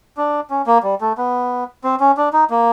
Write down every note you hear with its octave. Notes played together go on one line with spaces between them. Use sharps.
D4
C#4
A#3
G3
A3
B3
C4
C#4
D4
D#4
A#3